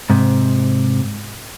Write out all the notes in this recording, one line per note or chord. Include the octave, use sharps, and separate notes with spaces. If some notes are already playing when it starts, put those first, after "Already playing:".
G#2 C3